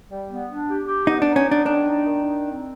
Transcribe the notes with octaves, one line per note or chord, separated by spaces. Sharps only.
G3
B3
D4
G4
G4
B3 D#4
D4
D#4
C#4
B3
D4
D#3 D4
D#4
D#3
D#4
C4